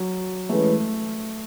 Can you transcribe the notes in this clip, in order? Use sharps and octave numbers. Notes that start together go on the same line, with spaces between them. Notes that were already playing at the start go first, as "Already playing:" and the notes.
Already playing: F#3
E3 G#3 A3 C#4 G#4 B4